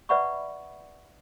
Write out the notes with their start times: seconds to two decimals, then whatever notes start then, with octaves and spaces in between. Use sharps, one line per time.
0.09 B4 D5 E5 F#5 B5 C#6